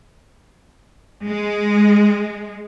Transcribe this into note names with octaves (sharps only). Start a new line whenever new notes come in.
G#3